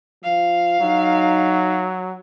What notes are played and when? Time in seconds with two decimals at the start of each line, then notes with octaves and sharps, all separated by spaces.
0.23 F3 F5
0.81 F#3 D#4